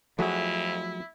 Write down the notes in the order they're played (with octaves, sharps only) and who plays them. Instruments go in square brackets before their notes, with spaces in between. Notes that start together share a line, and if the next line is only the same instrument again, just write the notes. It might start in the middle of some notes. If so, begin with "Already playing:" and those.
[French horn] F2 [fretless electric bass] F3 F#3 A3 [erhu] E4 [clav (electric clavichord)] F#4 G#4 F#5